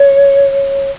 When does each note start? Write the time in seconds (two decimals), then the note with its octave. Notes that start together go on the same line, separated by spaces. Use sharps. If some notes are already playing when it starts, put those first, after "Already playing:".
Already playing: C#5